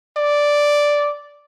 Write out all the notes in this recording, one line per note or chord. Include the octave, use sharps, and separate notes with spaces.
D5